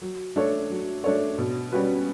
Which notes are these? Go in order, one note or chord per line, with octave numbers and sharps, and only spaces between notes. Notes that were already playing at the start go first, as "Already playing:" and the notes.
F#3
A3 D4 A4 C#5
F#3
A3 D4 A4 C#5
B2
G3 C#4 F#4 B4